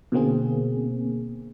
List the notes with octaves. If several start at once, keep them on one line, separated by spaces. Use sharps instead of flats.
B2 D3 A#3 C4 G#4